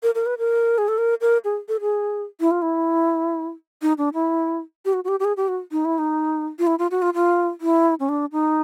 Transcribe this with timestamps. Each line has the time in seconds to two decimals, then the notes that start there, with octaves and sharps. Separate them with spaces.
0.03 A#4
0.15 A#4
0.26 B4
0.38 A#4
0.78 G#4
0.88 A4
0.98 A#4
1.21 A#4
1.44 G#4
1.68 A4
1.81 G#4
2.40 E4
2.51 F4
2.62 E4
3.82 D#4
3.98 D4
4.14 E4
4.85 G4
4.93 F#4
5.04 F#4
5.08 G4
5.20 G4
5.25 G#4
5.37 G4
5.48 F#4
5.72 D#4
5.85 E4
5.98 D#4
6.59 F4
6.67 E4
6.79 F4
6.91 F#4
7.02 F4
7.14 F4
7.61 E4
8.00 C#4
8.09 D4
8.32 D#4